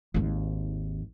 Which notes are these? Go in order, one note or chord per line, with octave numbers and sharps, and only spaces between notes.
G#1 D#2